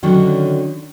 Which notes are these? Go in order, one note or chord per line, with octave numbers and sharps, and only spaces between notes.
D3 D#3 F#3 C#4 D4